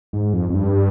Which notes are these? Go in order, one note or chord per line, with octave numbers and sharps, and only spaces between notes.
G#2
F2
F2
G2